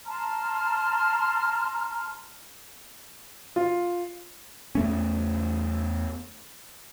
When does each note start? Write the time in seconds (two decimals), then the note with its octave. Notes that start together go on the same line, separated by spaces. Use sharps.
0.06 A5 A#5 C6 F6
3.56 F4
4.75 E2 A3 C#4